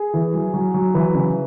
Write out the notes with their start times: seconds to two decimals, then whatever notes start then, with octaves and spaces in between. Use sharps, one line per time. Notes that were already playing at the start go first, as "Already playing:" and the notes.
Already playing: G#4
0.14 E3
0.34 F#3
0.54 F#3
0.74 F#3
0.94 E3 B4
1.14 C#3